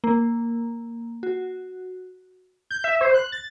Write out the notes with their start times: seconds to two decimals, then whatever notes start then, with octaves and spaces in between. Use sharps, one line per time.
0.04 A#3
1.23 F#4
2.70 G6
2.84 E5
3.01 C5
3.14 F#6
3.32 A6